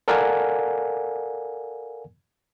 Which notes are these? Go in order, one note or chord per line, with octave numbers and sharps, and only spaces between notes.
A4 A#4 D5 F5 F#5 G#5